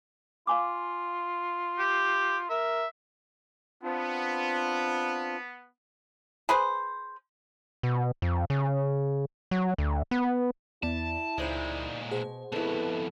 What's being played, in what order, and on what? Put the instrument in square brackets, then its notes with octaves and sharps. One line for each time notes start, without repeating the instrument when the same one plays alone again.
[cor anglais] F4 [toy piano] F5 G#5 D6
[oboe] G4
[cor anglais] A#4 [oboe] E5
[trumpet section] B3 [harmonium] C4 D4 F4
[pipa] G#4 B4 C5
[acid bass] B2
F2
C#3
F#3
D2
B3
[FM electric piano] E2 B3 D5 [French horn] E4 [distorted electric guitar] A5
[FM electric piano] C#2 B5 [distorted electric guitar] A#2 G#3 [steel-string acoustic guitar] D#4 C5 D5
[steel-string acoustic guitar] B2 [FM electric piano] G#4 C5
[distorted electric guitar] F2 B2 [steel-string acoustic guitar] E4 A4 [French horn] B4